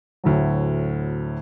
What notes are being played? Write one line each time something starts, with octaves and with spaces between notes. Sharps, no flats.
D2 A2 F#3